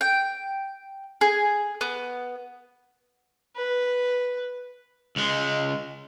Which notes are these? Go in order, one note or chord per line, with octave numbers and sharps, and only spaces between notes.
G5
G#4
B3
B4
C#2 G#3